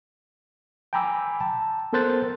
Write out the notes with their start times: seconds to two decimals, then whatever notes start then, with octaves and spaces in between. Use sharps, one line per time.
0.93 G5 G#5 A#5 B5 D6 E6
1.41 A5
1.93 B3 A4 A#4 C5 F#6 A6